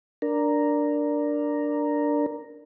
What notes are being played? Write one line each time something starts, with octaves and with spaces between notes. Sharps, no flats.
D4 A#4